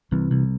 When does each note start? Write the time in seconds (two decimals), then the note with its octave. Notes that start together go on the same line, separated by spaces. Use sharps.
0.12 C2 C3 E3
0.31 C2